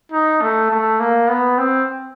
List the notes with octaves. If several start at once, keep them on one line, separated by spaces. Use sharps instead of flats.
D#4
A3
A3
A#3
B3
C4